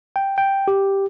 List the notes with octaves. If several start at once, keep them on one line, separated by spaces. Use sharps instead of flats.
G5
G5
G4